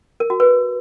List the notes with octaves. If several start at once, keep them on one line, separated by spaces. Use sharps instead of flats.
A#4
F#4
B4